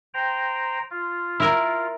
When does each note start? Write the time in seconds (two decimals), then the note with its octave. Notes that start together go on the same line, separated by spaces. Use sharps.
0.14 C5 G5 A#5
0.91 F4
1.40 E4 A#4